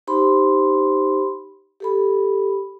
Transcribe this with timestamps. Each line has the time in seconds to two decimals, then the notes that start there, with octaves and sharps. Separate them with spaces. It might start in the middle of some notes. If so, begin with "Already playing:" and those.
0.07 D#4 G4 C5 B5 C6
1.80 G4 A4 B5